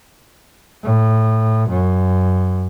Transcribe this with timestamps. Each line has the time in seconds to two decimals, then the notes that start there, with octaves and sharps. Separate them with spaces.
0.84 A2
1.69 F#2